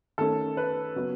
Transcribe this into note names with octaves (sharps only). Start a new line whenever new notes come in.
D#3 A3 C#4 A4
B4
C#3 F#3 B3